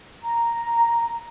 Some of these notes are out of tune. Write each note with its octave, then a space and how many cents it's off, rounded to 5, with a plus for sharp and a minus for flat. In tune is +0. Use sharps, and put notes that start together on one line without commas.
A#5 +0